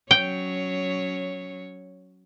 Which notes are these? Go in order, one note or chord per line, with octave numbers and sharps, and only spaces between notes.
F#3 C#4 C#5 G5